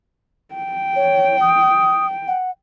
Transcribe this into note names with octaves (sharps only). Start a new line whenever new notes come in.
G5
C#5
D#6
F#5